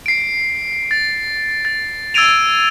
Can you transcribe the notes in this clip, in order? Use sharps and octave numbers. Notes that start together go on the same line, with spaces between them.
C7 D7
A6
A6
E6 G#6 A6 D7 D#7 F7